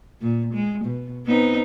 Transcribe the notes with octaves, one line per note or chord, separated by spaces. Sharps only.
A#2
G#3
B2
B3 C4 D#4